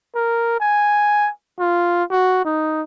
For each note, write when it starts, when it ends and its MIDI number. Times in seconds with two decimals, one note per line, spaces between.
0.15 0.59 70
0.60 1.30 80
1.59 2.03 65
2.11 2.43 66
2.45 2.82 63